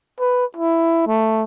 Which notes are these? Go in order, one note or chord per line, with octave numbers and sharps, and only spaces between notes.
B4
E4
A3